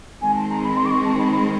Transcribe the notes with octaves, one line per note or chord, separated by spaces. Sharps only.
D#3 G#3 C4 G#5
A5
A#5
B5
C6
D6
C#6
A5
B5
B5